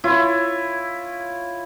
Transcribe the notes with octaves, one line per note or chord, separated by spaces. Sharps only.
E4 F4 C#5